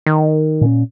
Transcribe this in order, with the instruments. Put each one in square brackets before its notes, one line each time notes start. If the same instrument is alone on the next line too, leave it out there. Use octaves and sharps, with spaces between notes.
[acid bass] D#3
[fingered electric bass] A#2 C#4